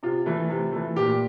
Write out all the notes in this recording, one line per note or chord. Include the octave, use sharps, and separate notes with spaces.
C3 F4
E3 A3
C3
E3 A3
A#2 G4